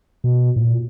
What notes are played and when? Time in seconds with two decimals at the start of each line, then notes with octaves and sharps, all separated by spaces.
0.24 B2
0.56 A2
0.61 A#2